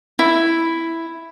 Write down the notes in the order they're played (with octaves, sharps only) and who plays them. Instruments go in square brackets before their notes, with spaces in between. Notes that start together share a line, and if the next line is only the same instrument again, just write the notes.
[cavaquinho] E4